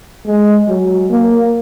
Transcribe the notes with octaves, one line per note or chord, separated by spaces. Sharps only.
G#3
F#3
A#3